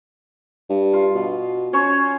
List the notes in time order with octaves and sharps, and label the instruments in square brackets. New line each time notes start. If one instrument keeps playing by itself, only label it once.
[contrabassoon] G2
[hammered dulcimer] F4
[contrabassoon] B2
[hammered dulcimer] C#4 C5 C#5